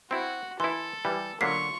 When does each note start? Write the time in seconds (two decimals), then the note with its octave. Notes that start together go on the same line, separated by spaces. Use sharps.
0.11 C4 E4 F#4
0.60 E3 E4 A4 C6
1.05 E3 G3
1.41 D3 F#3 A#3 F4 C#6 B6 C7